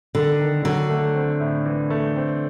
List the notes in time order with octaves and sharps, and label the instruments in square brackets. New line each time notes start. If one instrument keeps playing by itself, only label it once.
[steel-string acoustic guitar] D3 [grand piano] D#3
[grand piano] D#3
[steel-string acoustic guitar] D3 [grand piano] F#3
[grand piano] A3
C4
A2
E3
A3
C4